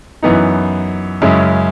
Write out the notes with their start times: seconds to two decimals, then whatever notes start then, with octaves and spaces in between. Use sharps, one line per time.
0.23 F#2 E3 B3 D#4
1.22 F#2 C#3 G#3 C#4 E4